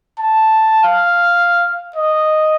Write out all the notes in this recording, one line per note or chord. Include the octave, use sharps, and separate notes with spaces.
A5
F5
D#5